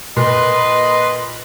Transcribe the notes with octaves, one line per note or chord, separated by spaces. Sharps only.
A#2 B4 D#5 C6